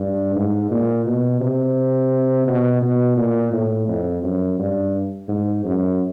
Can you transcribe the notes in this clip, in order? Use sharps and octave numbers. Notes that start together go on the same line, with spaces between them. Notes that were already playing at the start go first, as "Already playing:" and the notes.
Already playing: G2
G#2
A#2
B2
C3
B2
B2
A#2
A2
F2
F#2
G2
G#2
F#2